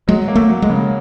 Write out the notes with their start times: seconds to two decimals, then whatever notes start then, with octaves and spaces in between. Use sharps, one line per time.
0.08 F#3 G#3
0.28 A#3
0.35 A3
0.49 F#3
0.62 G#3
0.70 C#3